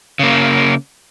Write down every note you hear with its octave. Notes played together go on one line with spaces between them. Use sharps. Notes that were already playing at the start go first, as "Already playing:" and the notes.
C#3 A#3